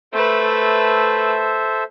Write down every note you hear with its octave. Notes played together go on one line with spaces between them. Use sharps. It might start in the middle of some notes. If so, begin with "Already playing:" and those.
A3 A4 B4 C5 E5